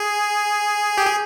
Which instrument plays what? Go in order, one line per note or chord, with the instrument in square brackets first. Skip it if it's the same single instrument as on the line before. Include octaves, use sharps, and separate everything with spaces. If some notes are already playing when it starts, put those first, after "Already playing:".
Already playing: [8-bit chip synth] G#4
G4
G#4